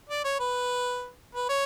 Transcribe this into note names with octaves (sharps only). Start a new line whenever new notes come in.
D5
C#5
B4
B4
C#5